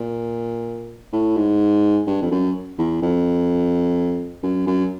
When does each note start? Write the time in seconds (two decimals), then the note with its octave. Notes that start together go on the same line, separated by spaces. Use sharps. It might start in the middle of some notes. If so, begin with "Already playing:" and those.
Already playing: A#2
1.13 A2
1.37 G#2
2.07 G2
2.22 F2
2.31 F#2
2.78 E2
3.02 F2
4.43 F#2
4.67 F#2